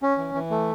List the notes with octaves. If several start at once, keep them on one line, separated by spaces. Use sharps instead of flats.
C#4
E3
E3
A3